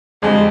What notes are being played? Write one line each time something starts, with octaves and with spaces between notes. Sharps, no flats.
F2 D3 G3 G#3